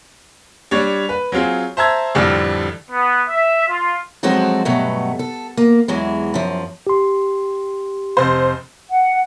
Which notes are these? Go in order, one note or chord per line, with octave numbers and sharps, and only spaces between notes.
G3 D4 C#5
B4
F#3 C4 F4 G#4
C5 E5 A5 A#5 E6 G#6
A1 F2 D3 G3 D5 F6
B3
E5
F4
F3 F#3 G#3 C4 F#4 A4
G2 B2 F#3 A3
A4
A#3
E2 E3 F#3 G#3
F#2 F3
G4 C6
F1 C5
F#5